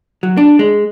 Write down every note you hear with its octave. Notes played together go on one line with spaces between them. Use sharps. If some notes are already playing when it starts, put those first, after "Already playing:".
F#3
D4
G#3